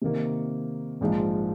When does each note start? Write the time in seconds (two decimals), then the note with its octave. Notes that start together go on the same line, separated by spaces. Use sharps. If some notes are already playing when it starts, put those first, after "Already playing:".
0.02 C3 D#3 A#3
1.01 A#1 G#2 F3